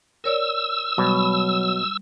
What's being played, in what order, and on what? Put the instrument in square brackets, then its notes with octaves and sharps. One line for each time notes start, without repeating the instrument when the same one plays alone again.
[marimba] A#4 C#5 D5 [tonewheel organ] E6
[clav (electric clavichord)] B2 [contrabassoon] F#3 [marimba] G3